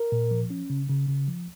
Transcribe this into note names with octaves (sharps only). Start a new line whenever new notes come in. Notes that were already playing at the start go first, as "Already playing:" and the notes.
Already playing: A#4
A#2
F3
C#4
C#3
C#3
C#3
F3